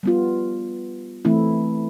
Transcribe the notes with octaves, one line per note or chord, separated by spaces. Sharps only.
G3 B3 F4
E3 A3 C4 E4